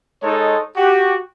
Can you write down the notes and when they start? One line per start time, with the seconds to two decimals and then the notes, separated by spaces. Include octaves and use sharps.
0.23 G#3 D#4 A4 C#5
0.77 F#4 G4